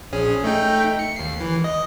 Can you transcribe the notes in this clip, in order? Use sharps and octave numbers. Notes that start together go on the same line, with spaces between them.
A#1 C#4 G#4
A3 D#4 G5
C#7
D#2 C7
E3
D#5